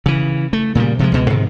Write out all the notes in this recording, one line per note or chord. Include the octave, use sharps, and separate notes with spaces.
C#3 E3
A3
A#2 C#3 F#3 G3
C3 F3 G#3
C#2 B2 G#3
G#2 C3 D#3